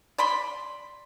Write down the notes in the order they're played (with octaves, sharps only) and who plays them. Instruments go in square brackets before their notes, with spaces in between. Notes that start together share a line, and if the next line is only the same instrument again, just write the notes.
[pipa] D5 B5 C6